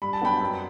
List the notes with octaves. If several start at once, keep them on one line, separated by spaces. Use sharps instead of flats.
G2 B5
A5
F#3 B3 D4 G5 B5
F#2